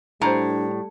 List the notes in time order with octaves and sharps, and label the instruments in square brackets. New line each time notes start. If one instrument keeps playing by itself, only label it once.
[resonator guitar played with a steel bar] A2 [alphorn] G3 [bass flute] D4 [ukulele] C5 A#5